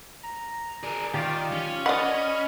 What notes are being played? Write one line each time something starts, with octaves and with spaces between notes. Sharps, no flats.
A#5
G#4 A#4 D5
D#3 F4 G4 D5 F5
C#4
D5 D#5 F#5 B5 F6